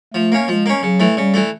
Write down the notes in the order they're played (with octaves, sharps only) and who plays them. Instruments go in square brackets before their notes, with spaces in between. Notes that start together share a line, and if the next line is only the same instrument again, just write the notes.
[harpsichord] F3 [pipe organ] A3
[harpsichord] A#3 C#4
[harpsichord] F3 [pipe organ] G#3
[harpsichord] A#3 C#4
[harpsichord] C#3 [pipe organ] F#3
[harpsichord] E3 A3
[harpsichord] C#3 [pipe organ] G3
[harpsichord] E3 A3